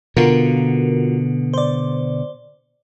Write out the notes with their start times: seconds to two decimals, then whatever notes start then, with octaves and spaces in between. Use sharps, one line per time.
0.17 B2 D3 F4 F#4 A#4
1.54 C5 D5